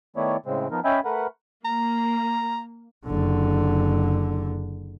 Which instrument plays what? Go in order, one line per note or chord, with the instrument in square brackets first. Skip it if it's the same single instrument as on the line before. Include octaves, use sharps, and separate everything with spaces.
[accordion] D#3 A3 B3 E4 C#5 D5
A2 C#3 G#3 C4
F3 B3 D#4 A#4
C#4 D#5 E5 G5 G#5 B5
A3 A#4 B4 F#5
[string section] A#3 [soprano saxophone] A#5
[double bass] F#1 D3